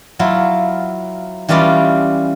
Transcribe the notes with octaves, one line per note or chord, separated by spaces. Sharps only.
F#3 E4 F4
E3 G3 C#4 F4 D5 D#5